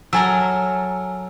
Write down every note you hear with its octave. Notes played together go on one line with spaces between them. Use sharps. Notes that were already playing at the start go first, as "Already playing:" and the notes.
F#3 A4 A#4 G#5 E6